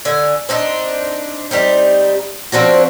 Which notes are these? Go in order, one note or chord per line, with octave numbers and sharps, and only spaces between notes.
D3 G#5
C4 D4 D#4
G3 C4 D#4
F3 C4 D4 F#4